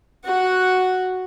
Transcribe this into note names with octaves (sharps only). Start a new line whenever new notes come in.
F#4 F#5